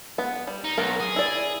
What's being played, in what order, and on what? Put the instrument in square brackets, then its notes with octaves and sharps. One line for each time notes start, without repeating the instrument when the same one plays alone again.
[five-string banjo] B3
G3
[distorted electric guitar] D#4
[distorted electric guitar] B1 [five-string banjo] B3 A#4
[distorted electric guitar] G#4
[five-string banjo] E4 D5